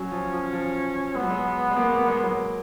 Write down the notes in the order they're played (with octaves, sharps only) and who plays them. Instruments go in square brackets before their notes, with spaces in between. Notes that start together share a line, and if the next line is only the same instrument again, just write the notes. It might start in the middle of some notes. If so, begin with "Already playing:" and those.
Already playing: [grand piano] F#3 [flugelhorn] C#4
[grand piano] F3
F3
F3
[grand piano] G#3 [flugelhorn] B3
[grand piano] F#3
G#3
G#3
A#3
A#3
G#3
F#3